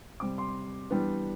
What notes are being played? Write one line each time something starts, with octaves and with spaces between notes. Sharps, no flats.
C3 G3 C4 D6
C6
E3 G3 B3 D4